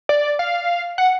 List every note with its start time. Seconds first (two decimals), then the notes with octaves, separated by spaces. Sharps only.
0.09 D5
0.39 F5
0.98 F#5